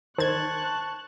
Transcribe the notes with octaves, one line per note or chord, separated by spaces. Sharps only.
D#3 C5 A5 C#6 F#6 G#6